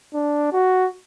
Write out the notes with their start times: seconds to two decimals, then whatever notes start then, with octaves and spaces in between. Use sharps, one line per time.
0.14 D4
0.53 F#4